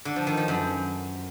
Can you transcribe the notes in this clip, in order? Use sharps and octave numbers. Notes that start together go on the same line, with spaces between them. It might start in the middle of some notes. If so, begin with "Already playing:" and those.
D3
F3
D#3
F3
F#2